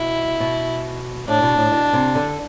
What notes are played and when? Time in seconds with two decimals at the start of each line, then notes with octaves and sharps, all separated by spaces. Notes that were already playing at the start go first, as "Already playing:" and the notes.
Already playing: B2 E4
0.40 B2
1.28 A2 D4
1.42 B2
1.57 A2
1.72 B2
1.93 C3
2.15 D3